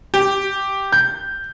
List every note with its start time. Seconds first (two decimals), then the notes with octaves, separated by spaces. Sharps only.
0.14 G4
0.92 G6